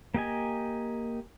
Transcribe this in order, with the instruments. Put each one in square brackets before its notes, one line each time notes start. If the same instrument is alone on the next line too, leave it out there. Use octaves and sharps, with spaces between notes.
[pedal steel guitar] A#3 G4 D#5 G#5